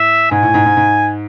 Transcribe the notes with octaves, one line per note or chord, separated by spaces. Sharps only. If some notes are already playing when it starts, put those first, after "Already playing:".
Already playing: A2 E5
G#2 G#5
A2
G#2
G#2
G#2